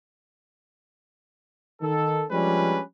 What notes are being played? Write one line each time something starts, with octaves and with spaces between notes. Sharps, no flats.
D#3 A4
F3 G3 G#3 C#4 D4 B4